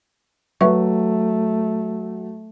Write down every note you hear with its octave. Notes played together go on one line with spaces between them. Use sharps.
F#3 A3 B4 E5 C#6